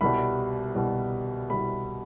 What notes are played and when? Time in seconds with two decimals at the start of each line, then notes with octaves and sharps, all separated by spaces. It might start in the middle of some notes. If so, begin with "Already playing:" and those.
0.01 C2 B2 G3 B5
0.75 C2 B2 G3
1.50 C2 B2 G3 B5